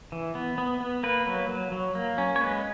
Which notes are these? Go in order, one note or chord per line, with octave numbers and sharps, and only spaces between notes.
E3
B3
B3
B3
A#3 B4
F#3
F#3
F#3
A#3
C#4
C#5
G#3 B4